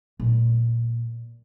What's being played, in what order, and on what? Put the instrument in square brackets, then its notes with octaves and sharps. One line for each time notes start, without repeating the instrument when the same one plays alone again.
[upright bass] A#2